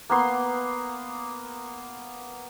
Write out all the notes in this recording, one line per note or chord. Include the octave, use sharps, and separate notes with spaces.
A#3 B3 C6